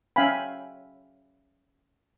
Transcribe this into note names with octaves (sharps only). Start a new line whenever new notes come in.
C#4 E5 F5 G5 G#5 B5